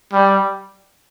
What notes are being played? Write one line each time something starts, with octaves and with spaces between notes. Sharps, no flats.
G3